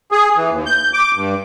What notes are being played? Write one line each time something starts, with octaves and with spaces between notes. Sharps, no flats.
G#4
E3
D#2
G6
D6
G2